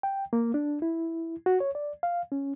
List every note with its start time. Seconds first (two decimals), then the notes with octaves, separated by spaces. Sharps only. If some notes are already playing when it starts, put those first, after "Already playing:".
0.03 G5
0.33 A#3
0.54 D4
0.82 E4
1.46 F#4
1.60 C#5
1.75 D5
2.03 F5
2.32 C#4